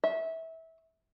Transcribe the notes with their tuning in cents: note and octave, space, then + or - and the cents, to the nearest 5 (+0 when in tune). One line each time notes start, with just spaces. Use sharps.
E5 -20